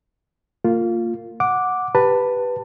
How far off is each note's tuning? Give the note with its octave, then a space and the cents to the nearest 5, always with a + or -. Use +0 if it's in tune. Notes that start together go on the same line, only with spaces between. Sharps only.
A#3 -30 F4 +0
F#5 -10 D6 +0
G4 +0 B4 +0 A5 +20